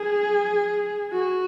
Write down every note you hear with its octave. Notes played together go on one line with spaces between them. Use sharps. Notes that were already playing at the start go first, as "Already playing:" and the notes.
Already playing: G#4
F#4